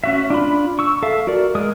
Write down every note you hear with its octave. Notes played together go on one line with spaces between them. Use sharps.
C#4 F#4 E5
D4 F4 B5
C#6 E6
A4 E5 F5
F#4 A#4 D5
G#3 A#4 D#6